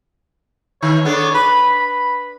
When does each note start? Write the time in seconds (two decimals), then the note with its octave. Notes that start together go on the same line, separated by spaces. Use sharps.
0.82 D#3 C#5
1.05 B3 D4 A4
1.34 B4 B5
1.79 B5